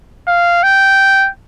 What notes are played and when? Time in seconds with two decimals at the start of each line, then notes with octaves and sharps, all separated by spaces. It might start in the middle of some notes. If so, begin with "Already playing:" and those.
0.28 F5
0.63 G5